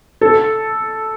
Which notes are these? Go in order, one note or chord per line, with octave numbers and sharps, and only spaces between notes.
A4